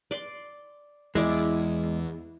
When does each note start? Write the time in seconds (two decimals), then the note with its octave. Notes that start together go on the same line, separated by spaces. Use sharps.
0.11 D5 C6
1.15 E2 G#3 E4 D5